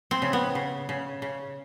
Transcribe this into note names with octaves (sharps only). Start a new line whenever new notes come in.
C4
C#3
B3
C#3
C#3
C#3